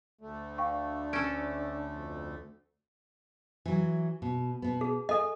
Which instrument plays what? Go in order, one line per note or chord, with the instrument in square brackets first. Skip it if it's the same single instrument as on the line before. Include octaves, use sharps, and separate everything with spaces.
[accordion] D2 A3
[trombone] D4 [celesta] F5 G5 C#6
[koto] C#4 A4 [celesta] D7
[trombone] F2
[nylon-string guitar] E3 F#3
B2
B2 B3
[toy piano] G#4
[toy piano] A4 D#5 [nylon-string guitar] G#5